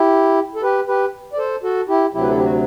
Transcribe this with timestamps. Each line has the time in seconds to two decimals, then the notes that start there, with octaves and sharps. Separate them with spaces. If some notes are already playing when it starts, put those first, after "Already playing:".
Already playing: E4 G4
0.55 A4
0.63 G4 B4
0.88 G4 B4
1.33 D5
1.38 A4 C5
1.63 F#4 A4
1.88 E4 G4
2.14 D2 C3 F#3 E4 G4
2.22 B4
2.29 A4
2.37 G4
2.44 F#4